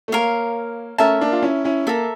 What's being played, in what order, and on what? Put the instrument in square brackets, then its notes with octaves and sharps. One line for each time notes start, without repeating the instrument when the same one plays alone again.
[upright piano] A3
[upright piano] A#3 [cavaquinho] A#4 C#5 F5
[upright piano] A3 C#4 [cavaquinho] A#4 E5 A5
[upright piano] A#3 D4
F4
C#4 E4
C#4 E4
[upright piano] A#3 [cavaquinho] A4 E5 A#5